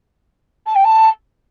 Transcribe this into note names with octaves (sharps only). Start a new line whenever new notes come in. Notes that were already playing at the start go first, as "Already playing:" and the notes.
A5
G5
A5